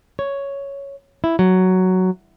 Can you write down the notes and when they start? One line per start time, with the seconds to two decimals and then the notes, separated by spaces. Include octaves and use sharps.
0.19 C#5
1.24 E4
1.39 F#3